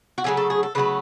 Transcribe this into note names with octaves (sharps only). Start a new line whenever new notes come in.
F#4
C#3 F#3 A3 G#4
A4
G#4
A4
C#3 F#3 A3 B4